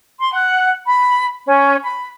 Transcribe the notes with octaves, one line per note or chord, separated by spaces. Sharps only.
C6
F#5
B5
C#4
B5